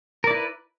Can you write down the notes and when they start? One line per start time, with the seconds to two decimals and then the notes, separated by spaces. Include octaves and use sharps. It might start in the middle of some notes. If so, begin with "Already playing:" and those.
0.24 A#4
0.27 D5
0.31 E4
0.34 B4